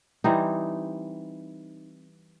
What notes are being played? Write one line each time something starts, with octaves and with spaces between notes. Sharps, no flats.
E3 G3 C4 D#4